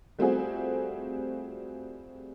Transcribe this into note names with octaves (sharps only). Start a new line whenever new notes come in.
G3 A3 C4 F4 F#4 G#4